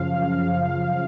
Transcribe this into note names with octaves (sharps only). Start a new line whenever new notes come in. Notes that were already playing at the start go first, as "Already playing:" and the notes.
Already playing: F#2 C#3 F3 F5
F#2
C#3 F3